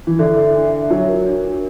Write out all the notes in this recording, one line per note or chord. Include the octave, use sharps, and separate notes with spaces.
E3
D3 E5
E5
D4
E5
F#3 D4
A#4
D4
D4